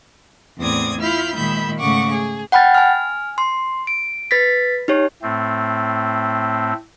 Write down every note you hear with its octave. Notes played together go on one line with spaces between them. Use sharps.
E2 A2 C4 D5 D#6 G#6
E4 F4 B5 F6 G6
A#2 D#3 G#3 E5 B5 G6
G#2 C#3 A3 F#5 C#6 D6
G#4
F#5 G5 B5 F6 A6
G#5 F6
C6
D7
B4 A6 B6
D#4 G4 C#5
A2 A3 C4